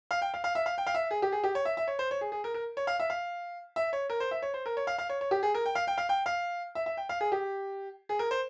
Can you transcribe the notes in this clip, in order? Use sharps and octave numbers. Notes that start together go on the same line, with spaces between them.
F5
G5
F5
F5
E5
F5
G5
F5
E5
G#4
G4
G#4
G4
C#5
E5
E5
C#5
C5
C#5
G#4
G#4
A#4
A#4
C#5
F5
E5
F5
E5
C#5
A#4
C5
E5
C#5
C5
A#4
C#5
F5
F5
C#5
C#5
G4
G#4
A#4
G5
F5
G5
F5
G5
F5
E5
E5
G5
F5
G#4
G4
G#4
A#4
C5